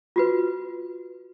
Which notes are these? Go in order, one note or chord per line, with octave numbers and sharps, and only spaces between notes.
F4 F#4 B4